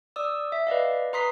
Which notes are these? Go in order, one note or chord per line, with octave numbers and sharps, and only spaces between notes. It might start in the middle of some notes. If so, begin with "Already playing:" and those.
D5 D#6 E6
E5
B4 D5 D#5 F5
B4 A#5 C6 D#6 B6 C7